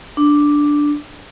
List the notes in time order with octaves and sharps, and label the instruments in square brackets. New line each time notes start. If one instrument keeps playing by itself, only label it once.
[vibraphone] D4